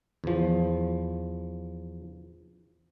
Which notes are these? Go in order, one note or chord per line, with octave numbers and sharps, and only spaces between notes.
E2 F3